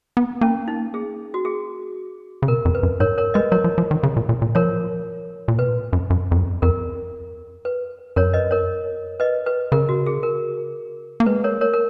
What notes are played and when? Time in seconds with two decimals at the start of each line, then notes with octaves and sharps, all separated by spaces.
0.17 B3
0.41 A#3 C#4
0.68 D#4
0.94 G#4
1.34 F#4
1.45 G#4
2.42 C#3
2.48 B2 A#4
2.65 F2
2.75 B4
2.83 F#2
3.00 G#2 A#4 C#5
3.18 A#4 C#5
3.34 G#3 B4 D#5
3.52 F#3 A#4 C#5
3.64 F3
3.78 F3
3.91 D#3
4.03 C#3
4.17 A#2
4.29 A#2
4.42 A#2
4.55 F3 A#4 C#5
5.48 A#2
5.58 B2 B4
5.93 F#2
6.10 F#2
6.31 F2
6.36 F#2
6.62 F2 A#4
7.65 B4
8.16 F#2 A#4 C#5
8.34 B4 D#5
8.51 A#4 C#5
9.20 B4 D#5
9.46 B4
9.72 C#3 A#4
9.89 F#4
10.06 G#4
10.23 A#4
11.20 A#3
11.26 G#3 B4
11.44 A#4 C#5
11.61 A#4 C#5
11.73 A#4